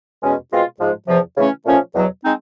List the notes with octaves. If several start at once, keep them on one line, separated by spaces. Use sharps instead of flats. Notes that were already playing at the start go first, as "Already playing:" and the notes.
E2 B2 G#3 C#4
B2 G#3 C4 F4
G#2 F3 G#3
E2 C3 F3
C#3 E3 A3 C#4
A#2 F3 A3 C#4
E2 B2 F#3
G#3 C4 D#4